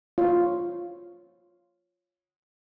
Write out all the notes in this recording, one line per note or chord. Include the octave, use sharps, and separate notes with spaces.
F4 C#5 C6